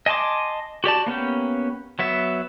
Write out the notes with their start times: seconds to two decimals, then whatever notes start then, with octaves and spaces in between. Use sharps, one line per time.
0.06 D#5 G#5 A5 C6 D6
0.84 F#4 G4 D5 A5
1.06 A#3 B3 C#4 G4
1.99 F#3 B3 E5